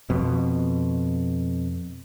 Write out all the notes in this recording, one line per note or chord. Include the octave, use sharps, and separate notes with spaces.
F2 B2